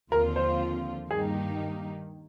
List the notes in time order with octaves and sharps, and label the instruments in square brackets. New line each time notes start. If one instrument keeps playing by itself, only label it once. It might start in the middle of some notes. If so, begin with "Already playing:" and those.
[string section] D#2 D3 F3 C4 F4 [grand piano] A#4
[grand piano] C5
[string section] G2 D#3 A#3 D#4 G4 [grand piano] G#4